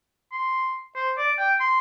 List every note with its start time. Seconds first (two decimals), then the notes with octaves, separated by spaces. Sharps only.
0.32 C6
0.96 C5
1.18 D5
1.39 G5
1.60 C6